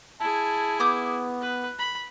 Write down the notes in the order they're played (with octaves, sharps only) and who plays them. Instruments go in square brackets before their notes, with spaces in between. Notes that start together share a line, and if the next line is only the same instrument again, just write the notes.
[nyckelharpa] E4 G#4 [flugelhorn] A5
[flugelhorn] B3 [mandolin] D6 D#6 G6
[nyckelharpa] B4
B5